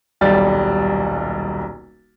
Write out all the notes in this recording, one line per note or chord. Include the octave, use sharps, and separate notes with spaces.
D#1 B1 G3 D5 A6